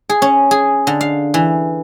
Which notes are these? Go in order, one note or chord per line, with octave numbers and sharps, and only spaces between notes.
G#4
C#4
G#4
D3
F5
E3